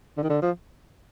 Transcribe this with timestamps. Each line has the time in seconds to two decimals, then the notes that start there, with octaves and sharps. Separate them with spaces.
0.17 D3
0.23 D#3
0.30 D3
0.42 F3